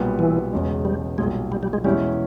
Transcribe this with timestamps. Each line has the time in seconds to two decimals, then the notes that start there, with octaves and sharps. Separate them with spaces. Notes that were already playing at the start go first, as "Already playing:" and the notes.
Already playing: B1 A#2 G3 B3
0.19 E3
0.53 E1 E2 C#3 G#3
0.85 G3
1.18 B1 A#2 G3 G#3
1.52 G3
1.63 G3
1.73 G#3
1.84 E2 B2 G3 G#3 C#4 E4